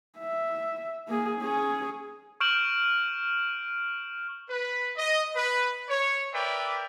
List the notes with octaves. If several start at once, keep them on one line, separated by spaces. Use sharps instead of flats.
E5
A#3 G#4
C#4 G#4
C#6 F6 G6 D7 E7 F#7
B4
D#5
B4
C#5
A#4 B4 D5 E5 G5